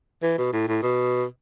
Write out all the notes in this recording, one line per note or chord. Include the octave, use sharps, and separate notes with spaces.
E3
B2
A2
A2
B2